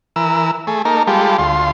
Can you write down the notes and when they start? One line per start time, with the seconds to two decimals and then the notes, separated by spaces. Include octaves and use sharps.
0.16 E3 A#4 E6
0.67 A3 G#4
0.85 A#3 D#4 A4 A#4
1.07 G3 G#3 F4 G4 A4
1.38 D2 F4 C6